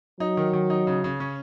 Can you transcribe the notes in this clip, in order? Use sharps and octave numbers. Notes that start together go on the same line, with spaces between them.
F#3 D#4
D#3
D#3
D#4
C#3
C#3
C#4